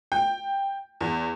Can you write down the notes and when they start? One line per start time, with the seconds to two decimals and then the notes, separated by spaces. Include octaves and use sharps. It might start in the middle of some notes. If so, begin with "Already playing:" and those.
0.12 G5
1.01 E2